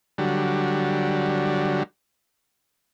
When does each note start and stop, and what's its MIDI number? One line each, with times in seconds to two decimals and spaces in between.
0.18 1.83 50
0.18 1.83 54
0.18 1.83 55